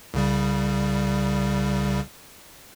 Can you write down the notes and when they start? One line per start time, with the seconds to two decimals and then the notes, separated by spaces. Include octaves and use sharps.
0.14 C2 C#3 G3